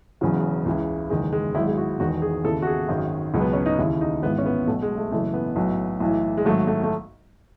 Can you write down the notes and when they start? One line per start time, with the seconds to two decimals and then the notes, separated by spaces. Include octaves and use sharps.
0.21 E1 E2 C#3 F#3
0.65 C#2 C#3 E3
1.10 F#1 E2 D#3 G#3
1.32 G#3
1.55 G#1 G#2 F#3 E4
1.67 G#4
1.78 F#4
1.99 E1 E2 D#3 F#4
2.22 G#4
2.45 D#2 C#3 E3 A4
2.62 F#4
2.67 G#4
2.88 G#1 F#2 D#3 F#3
3.34 C#2 B2 F#3
3.41 B3
3.53 C#4
3.66 D#4
3.79 D#2 C#3 E3 E4
4.01 D#4
4.22 G#1 G#2 E3 B3
4.38 C#4
4.46 B3
4.67 B1 B2 F#3 A3
4.82 G#3
4.97 A3
5.11 F#1 F#2 E3 A3
5.34 B3
5.56 B1 A2 F#3
6.00 B1 A2 E3
6.37 G#3
6.45 G#1 G#2 F#3 A3
6.67 A3
6.83 A3